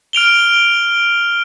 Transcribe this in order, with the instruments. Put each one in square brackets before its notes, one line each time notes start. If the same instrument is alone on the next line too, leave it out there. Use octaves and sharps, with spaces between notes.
[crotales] F6 D7 F7 G7